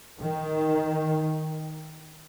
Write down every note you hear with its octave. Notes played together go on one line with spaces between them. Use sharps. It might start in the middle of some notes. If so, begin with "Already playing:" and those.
D#3